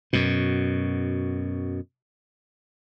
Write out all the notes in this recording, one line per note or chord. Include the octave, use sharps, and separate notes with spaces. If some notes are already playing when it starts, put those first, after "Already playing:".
F#2 B2